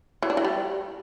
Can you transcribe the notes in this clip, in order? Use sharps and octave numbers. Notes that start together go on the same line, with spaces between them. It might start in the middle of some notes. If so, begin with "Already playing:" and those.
E3
D4
E3
G3